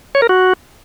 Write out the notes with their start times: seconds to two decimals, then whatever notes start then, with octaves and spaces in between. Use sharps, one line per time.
0.15 C#5
0.22 A#4
0.29 F#4